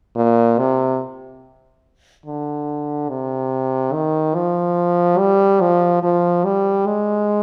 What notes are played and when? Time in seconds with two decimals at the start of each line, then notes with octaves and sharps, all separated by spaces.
0.16 A#2
0.58 C3
2.26 D3
3.09 C3
3.93 D#3
4.35 F3
5.18 G3
5.61 F3
6.03 F3
6.44 G3
6.86 G#3